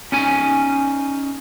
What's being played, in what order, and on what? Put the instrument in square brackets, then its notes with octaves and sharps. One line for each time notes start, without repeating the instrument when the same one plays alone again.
[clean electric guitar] C#4 D#4 G#5